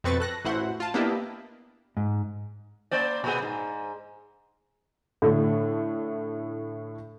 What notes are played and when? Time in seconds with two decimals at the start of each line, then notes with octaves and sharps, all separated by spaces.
0.04 F2 B2 C4 B4 C#6 A6
0.20 A4 F#6 A#6
0.45 A1 A2 E4 F#4 C5 F#5
0.80 F4 A5
0.94 A#3 B3 D4 E4 G4 D#5
1.97 G#2
2.91 A#3 C5 D5
3.24 A#2 B3 G#4
3.42 G#2
5.22 A2 D3 A3